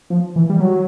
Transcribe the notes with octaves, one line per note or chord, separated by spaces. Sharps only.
F3
E3
G3
F#3